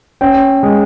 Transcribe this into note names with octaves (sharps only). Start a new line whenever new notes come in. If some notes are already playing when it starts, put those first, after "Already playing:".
C#4 G5
G#3